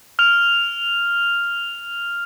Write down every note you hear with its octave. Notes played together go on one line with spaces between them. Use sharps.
F6 F7